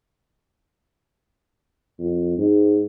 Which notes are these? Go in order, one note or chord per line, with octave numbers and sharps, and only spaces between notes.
F2
G#2